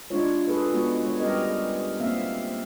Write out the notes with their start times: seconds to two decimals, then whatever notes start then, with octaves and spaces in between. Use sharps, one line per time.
0.10 G#3 D4 D#4 F4 C#5
0.47 G#4 A4 B4
0.73 G#3 B3 F#4
1.03 G#3 C#5
1.20 G3 C#4 G4 A#4 D#5
2.00 A#3 C4 E5 F5